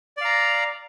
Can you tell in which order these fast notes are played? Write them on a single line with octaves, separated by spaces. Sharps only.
D5 F5 A#5